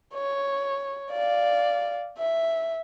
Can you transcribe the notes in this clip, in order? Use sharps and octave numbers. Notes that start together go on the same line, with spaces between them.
C#5
D5 F5
E5